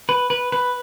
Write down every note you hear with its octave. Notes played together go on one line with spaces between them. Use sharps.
B4
B4
B4